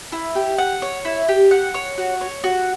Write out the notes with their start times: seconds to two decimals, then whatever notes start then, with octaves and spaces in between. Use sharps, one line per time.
0.12 E4
0.35 G4
0.58 F#5
0.82 C#5
1.05 E4
1.29 G4
1.51 F#5
1.74 C#5
1.98 F#4
2.21 C#5
2.44 F#4